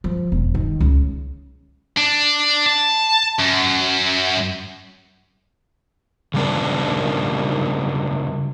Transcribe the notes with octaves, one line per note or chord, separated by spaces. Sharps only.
F3
E1
D#3
C#2
D4
A5
F#2
C#3 F#3 G3 D4 A#4